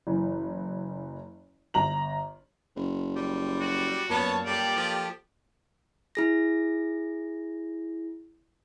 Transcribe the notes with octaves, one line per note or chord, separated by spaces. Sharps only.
F#1 E3
G1 A#5 F#7
F#1
G3
F#4
F#2 A#2 B3 C#5 A5
G3 G4 A4 D5
F3
E4 G#4 A#6